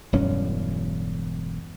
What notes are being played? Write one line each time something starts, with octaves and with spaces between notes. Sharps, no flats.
E1 G2 F#3 C#4